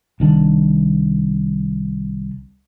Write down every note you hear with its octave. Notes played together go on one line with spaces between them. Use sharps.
C2 D#3 D4